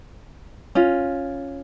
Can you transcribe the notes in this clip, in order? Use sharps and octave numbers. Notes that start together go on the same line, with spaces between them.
C#4 F4